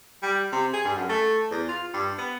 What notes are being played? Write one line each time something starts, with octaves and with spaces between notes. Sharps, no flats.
G3
C3
G#4
G2
F#2
A3
E2
F4
G2
B3